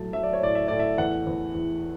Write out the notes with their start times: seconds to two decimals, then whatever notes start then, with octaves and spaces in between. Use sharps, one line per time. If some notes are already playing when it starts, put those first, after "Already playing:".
Already playing: A2 F#3 A3 A5
0.13 F#3 E5
0.23 D5
0.33 C#5
0.41 A2 D5
0.55 E5
0.68 A2 D5
0.80 E5
0.98 E2 F#5
1.27 E2
1.54 E2